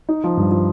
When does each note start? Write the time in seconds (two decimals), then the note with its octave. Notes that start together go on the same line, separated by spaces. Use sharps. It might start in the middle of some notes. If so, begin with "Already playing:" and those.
0.09 D#4
0.24 F3
0.37 G2
0.51 F3